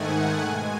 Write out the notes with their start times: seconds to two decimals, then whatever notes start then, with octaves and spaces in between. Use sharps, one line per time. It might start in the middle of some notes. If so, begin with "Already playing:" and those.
Already playing: G#2 D#3 A3 F#5 G#5
0.13 G#5
0.41 B2 G#3